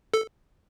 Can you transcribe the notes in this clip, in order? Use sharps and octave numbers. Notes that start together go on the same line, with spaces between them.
A4